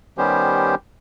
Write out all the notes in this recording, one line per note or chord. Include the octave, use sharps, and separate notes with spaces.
D#3 G3 B3 C#4 G4 C5